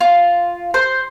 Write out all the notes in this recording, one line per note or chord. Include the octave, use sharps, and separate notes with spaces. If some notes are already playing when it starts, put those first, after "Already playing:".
F4
C5